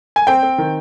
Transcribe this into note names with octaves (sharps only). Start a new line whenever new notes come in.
G#5
C4 G5
C4
D#3